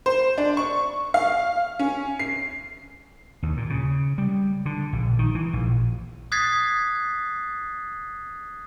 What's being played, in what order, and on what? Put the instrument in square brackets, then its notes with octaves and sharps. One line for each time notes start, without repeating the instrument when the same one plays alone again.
[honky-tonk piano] C5
D4
C#6
F5
C#4
C7
[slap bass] D#2
A#2
C#3
G3
D3
A#1
D#3
E3
A#1
[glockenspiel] D#6 F#6 G#6 A6 B6 C7